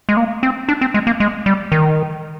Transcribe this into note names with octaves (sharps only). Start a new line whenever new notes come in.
G#3
A#3
C4
D4
C4
G#3
A#3
G#3
G3
D#3